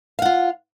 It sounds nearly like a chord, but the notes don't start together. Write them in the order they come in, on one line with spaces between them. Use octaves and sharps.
F5 F#5 F4